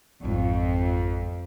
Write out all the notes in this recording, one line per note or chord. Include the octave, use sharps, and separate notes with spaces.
G#1 F2 A2